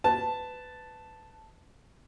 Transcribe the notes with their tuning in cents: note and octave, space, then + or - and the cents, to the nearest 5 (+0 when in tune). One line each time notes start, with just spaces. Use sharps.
B4 +20 A5 +0